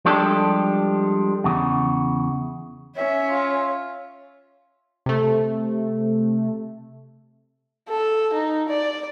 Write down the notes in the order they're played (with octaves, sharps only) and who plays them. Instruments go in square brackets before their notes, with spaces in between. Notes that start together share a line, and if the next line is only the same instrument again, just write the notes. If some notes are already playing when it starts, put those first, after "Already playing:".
[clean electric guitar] F3 G3 G#3 D4 G4 A4
E2 C#3
[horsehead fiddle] C#4 [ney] C#5 [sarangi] E5
[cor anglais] F4
[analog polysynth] C3 A3
[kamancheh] A4
D#4
D5